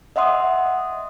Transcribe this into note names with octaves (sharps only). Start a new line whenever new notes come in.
D#5 E5 F#5 C6 D#6